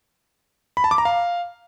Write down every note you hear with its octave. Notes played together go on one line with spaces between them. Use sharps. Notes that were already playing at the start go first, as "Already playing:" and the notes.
B5
A5
D6
A#5
F5